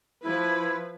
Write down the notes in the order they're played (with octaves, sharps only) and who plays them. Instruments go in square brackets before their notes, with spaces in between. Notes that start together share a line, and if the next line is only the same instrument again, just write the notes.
[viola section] F3 B4 [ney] E4